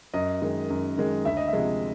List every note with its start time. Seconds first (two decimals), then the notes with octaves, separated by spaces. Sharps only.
0.14 F#2 D#5
0.42 D#3 G#3
0.70 F#2
0.98 D#3 G#3
1.25 D2 E5
1.37 D#5
1.48 E5
1.53 C3 F3 G#3